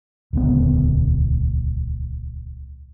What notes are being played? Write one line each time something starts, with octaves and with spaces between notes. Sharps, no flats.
D#1 C#2 D3 B3